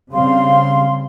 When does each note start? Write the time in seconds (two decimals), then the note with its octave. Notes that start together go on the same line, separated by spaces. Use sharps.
0.12 C#3 G3 C4 F5 C6